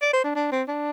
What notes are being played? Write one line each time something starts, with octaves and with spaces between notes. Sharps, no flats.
D5
C5
D4
D4
C4
D4